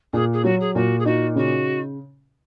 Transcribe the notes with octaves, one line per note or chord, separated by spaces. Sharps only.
A#2 G#4
G#4
F#3 F#4
G#4
A#2 F#4
G#4
D#4 F#4
C#3 F#4